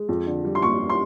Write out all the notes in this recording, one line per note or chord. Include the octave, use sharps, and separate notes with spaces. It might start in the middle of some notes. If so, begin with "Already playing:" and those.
Already playing: G#3
F2
D3
G3
C6
A#3 C#6
C6